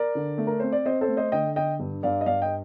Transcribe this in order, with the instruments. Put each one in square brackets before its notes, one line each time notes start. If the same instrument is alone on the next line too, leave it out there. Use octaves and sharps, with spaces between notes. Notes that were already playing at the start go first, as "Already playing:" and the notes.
Already playing: [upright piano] A#4 D5
D3
A3
A#4
C4 C5
D5
C4 C5 D#5
A4 C5
A3
C5 D#5
D3 D#5 G5
D3 D#5 G5
G2
G2 D5 F5
D#5
G2 D5 F5
D#5 G5